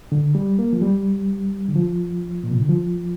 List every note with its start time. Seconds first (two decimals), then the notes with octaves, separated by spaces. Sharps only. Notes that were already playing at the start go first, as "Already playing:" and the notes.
0.12 D3
0.35 G3
0.59 A#3
0.73 F3
0.82 G3
1.68 D3
1.76 F3
2.44 A#2
2.51 C3
2.61 D3
2.69 F3